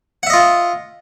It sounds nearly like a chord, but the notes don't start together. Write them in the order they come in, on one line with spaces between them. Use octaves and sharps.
F#5 E5 D#5 F4